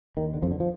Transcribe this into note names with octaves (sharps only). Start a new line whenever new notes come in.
D#2 D#3
D3
F2 F3
D3
F3